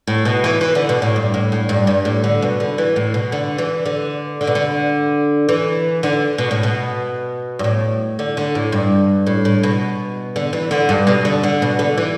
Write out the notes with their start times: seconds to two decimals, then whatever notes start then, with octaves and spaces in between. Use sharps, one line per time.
0.07 A2
0.25 B2
0.44 E3
0.61 E3
0.75 D3
0.89 B2
1.02 A2
1.16 G2
1.34 A2
1.52 A2
1.69 G2
1.87 G2
2.05 A2
2.24 D3
2.42 B2
2.60 D3
2.78 E3
2.96 A2
3.14 B2
3.32 D3
3.58 E3
3.85 D3
4.41 D3
4.47 B2
4.55 D3
5.49 E3
6.03 D3
6.38 B2
6.51 A2
6.63 B2
7.59 G2
7.64 A2
8.19 D3
8.37 D3
8.55 A2
8.72 G2
9.27 A2
9.45 A2
9.63 B2
10.36 D3
10.53 E3
10.71 D3
10.89 G2
11.07 B2
11.25 D3
11.44 D3
11.62 B2
11.79 D3
11.98 E3